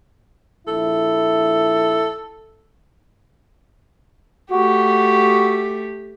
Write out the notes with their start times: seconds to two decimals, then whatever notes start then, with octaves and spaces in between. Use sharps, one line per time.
0.68 A#1 E4 A4
4.51 A3 F#4 G4